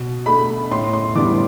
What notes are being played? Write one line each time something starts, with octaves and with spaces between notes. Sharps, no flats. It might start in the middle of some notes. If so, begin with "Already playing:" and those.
Already playing: B2
A3 D4 B5
A2 C6
C6
E3 G3 B3 D4 D6